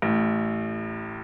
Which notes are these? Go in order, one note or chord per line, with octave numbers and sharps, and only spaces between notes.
A1 A2